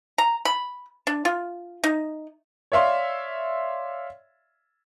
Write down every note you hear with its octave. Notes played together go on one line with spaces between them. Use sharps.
A#5
B5
D4
F4
D#4
C#5 D5 E5 F5 C6